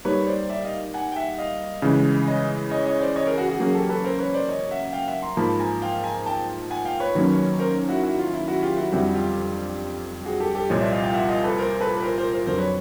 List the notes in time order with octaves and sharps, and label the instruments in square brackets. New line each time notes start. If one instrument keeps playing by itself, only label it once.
[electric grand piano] G3 A#3 D#4 G4 [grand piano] B4 C#5
[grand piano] C#5
C5 D5
D5 E5
D#5 F5
F#5 G#5
G5
E5 F#5
D#5 F5
[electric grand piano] C#3 E3 G#3
[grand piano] C#5 D#5
C#5 D#5
C#5 D#5
C5 D5
C#5 D#5
G#4 A#4
F#4 G#4
F#4 G#4
[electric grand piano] F#3 A#3 C#4 [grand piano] F#4 G#4
[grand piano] G4 A4
A4 B4
A#4 C5
B4 C#5
C5 D5
C#5 D#5
E5 F#5
F5 G5
E5 F#5
A#5 C6
[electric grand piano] G#2 F3 A#3 [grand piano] A5 B5
[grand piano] G#5 A#5
F5 G5
G#5 A#5
G5 A5
F#5 G#5
F5 G5
B4 C#5
[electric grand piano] D#3 F#3 A#3 C#4
[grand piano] A#4 C5
E4 F#4
E4 F#4
F4
E4
E4 F#4
F4 G4
E4 F#4
[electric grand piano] F2 D3 G3 C4 [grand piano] E4 F#4
[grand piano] F4 G4
F#4 G#4
G4 A4
G4 A4
[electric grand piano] C2 A#2 F3 [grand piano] C#5 D#5
[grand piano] D5 E5
D#5 F5
F5 G5
E5 F#5
D#5 F5
A4 B4
A#4 C5
A4 B4
B4
A#4 C5
A#4 C5
A#4 C5
[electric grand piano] F2 D3 F#3 [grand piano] A#4 C5
[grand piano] B4 C#5